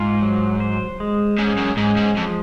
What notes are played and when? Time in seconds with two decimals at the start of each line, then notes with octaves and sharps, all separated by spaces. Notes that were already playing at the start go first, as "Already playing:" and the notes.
Already playing: G#2 F4
0.22 F#3
0.60 C5
1.00 G#3
1.39 G#2 C#4
1.57 F#2
1.76 G#2 G#3
1.96 G#2
2.16 F2 F3